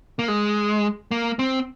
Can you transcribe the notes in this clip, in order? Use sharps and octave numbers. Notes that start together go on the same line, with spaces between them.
A#3
G#3
A#3
C4